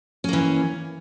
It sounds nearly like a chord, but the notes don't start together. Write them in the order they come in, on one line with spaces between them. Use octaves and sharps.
C#4 A#3 E3